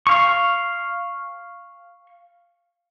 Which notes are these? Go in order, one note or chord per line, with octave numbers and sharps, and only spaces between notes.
F5 C#6